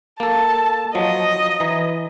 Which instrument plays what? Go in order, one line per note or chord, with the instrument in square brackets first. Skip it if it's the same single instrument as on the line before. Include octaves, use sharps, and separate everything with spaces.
[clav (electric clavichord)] A#3 A4 [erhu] A5
[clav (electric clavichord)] F3 F#3 [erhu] D#5
[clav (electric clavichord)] E3 A#5